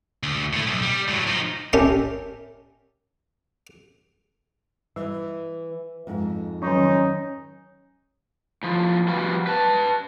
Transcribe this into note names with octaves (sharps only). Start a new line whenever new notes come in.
D2
A2 A3
B1
G3
A2 F#3
F3 D#4
C#4 G4 A#4 E5 A5
E3 G3
F2 G#2
D#3 F#3 C#4 D#4
A2 F3
F3 G3 B3 F4 F#4
B4 A5